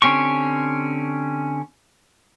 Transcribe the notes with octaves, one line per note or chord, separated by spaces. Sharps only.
D3 C4 C#4 G4 C#6